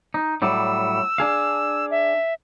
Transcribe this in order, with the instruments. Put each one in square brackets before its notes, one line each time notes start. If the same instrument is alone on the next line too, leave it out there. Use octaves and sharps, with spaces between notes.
[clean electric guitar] D#4
[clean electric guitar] A2 F#3 G3 [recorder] E6
[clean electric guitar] D4 G#4 F5
[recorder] E5